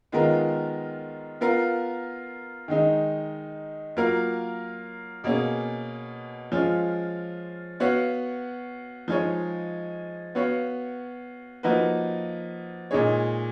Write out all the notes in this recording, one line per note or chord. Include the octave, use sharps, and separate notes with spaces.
D#3 G#3 B3 F4 A#4
B3 F4 A#4 F5
D#3 G#3 D#4
F#3 A#3 F4 A#4 F5
B2 A#3 C#4 G#4
F3 G#3 C#4 F4
B3 F#4 C#5 F5
F3 G#3 D#4 G#4 C#5
B3 F#4 C#5 F5
F3 A#3 D#4 F#4 B4
A#2 G#3 D#4 G#4 C#5